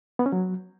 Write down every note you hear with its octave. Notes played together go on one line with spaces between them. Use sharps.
B3
C#4
F#3